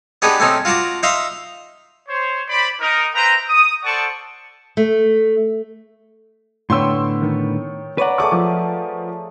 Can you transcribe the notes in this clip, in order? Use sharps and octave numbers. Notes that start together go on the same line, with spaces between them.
B3 D4 D#4 G4 G#4 B4
A3 C4 C#4 D#4
F4 F#4 A5 A#5 D6
D#4 E5 F5 A#5 C6
C5 C#5
C5 D5 B5
D#4 A#4
B4 C5 E5 G5 A#5
D#6
A4 C5 D5 F#5 A5 C#6
A3
A2 D3 B3 C#5 G5 C6 C#6 E6
D#3
B4 C#5 D5 F#5 A#5
A3 G#4 A5 C#6 D6
F3